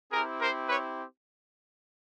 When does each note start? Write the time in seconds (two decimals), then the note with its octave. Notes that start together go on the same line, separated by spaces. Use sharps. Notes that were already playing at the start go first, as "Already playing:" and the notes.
0.12 C4 E4 G4 G#4 A#4
0.40 A#4 C5
0.69 B4 C#5